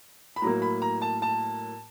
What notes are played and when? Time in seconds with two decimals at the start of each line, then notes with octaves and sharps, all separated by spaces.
0.36 B5
0.42 A2 F#3 A#3 A#5
0.62 B5
0.82 A#5
1.02 A5
1.22 A5